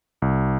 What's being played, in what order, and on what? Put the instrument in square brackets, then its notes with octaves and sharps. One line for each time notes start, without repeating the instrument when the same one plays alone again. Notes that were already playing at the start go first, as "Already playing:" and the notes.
[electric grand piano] C2